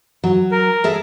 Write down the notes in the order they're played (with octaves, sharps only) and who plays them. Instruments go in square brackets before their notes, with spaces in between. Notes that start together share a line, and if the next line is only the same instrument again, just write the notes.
[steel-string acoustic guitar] F#3
[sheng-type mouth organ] A#4
[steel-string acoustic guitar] G#4 A4 E5